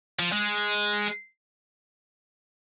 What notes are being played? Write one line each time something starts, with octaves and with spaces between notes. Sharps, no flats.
F3
G#3